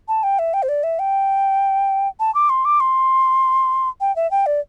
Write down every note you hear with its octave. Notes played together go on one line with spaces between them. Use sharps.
A5
G5
E5
G5
C5
D5
E5
G5
A5
D6
C6
D6
C6
G5
E5
G5
D5